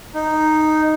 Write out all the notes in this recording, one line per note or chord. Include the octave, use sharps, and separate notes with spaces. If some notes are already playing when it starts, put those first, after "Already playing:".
D#4